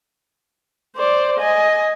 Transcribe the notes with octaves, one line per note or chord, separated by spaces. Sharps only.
C5 D5
D#5 G#5